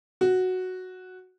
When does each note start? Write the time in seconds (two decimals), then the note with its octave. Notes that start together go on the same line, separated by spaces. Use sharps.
0.21 F#4